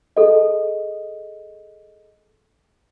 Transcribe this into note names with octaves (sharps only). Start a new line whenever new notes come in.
G#4 A4 D#5